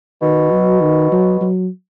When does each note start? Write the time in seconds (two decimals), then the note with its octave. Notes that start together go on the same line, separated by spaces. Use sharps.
0.22 B2 D#3
0.52 F#3
0.82 D#3
1.12 F#3
1.41 F#3